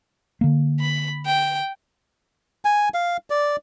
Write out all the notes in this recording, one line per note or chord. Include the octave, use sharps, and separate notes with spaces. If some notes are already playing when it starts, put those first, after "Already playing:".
D3 A#3
B5
G5
G#5
F5
D5